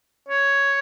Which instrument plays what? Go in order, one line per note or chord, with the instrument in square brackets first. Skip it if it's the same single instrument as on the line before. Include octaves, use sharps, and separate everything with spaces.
[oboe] C#5